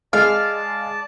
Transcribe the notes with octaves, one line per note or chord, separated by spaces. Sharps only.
G#3 D5 F5 A5